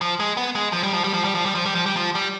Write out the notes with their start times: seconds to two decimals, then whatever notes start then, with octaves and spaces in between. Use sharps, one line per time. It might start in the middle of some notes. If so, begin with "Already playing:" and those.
0.01 F3
0.20 G#3
0.37 B3
0.55 G#3
0.73 F3
0.83 G3
0.94 F3
1.04 G3
1.14 F3
1.24 G3
1.35 F3
1.45 G3
1.55 F3
1.65 G3
1.75 F3
1.86 G3
1.96 F3
2.15 G3